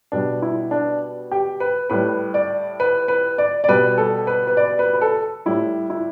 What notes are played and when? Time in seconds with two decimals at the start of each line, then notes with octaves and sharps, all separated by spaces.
0.12 B2 G3 D4
0.42 E4
0.71 D4
1.31 G4
1.60 B4
1.90 A2 G3 B4
2.34 D5
2.80 B4
3.08 B4
3.38 D5
3.64 D5
3.68 B2 G3 B4
3.98 A4
4.27 B4
4.47 B4
4.57 D5
4.79 B4
4.93 B4
5.01 A4
5.46 A2 G3 E4
5.90 E4